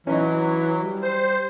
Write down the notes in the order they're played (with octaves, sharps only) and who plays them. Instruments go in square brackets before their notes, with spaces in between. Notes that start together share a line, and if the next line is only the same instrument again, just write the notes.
[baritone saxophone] E3 [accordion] F#3 [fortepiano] C#4 D#4
[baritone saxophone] G3
[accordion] C5